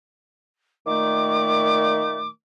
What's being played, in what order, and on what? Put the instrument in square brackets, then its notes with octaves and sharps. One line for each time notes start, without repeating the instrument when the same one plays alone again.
[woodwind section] A#2 D#3 A3 [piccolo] D6